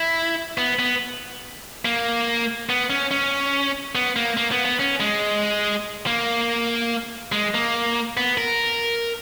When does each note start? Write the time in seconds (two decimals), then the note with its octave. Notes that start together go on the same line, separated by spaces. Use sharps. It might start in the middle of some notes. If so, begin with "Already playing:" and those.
Already playing: E4
0.58 B3
0.79 B3
1.85 A#3
2.69 B3
2.90 C#4
3.11 C#4
3.95 B3
4.16 A#3
4.37 A#3
4.52 B3
4.65 B3
4.79 C#4
5.00 G#3
6.06 A#3
7.32 G#3
7.54 A#3
8.17 B3
8.38 A#4